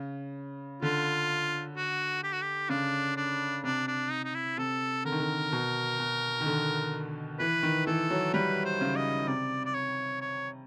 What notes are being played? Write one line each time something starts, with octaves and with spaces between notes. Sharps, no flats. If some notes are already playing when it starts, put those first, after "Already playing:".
Already playing: C#3
D3 F4
F#4
G4
F#4
G4
C#3 D4
D4
C3 D4
D4
D#4
D#4
E4
C3 A4
D3 A#4
D#3
D3
B2
B2
D#3
D3
E3 B4
D#3
E3 A4
F#3
G3 B4
C5
C#3
D#5
C3 D5
D5
C#5
C#5